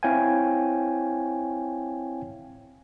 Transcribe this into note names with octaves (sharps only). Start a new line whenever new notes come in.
C4 E4 C#5 F5 G5 G#5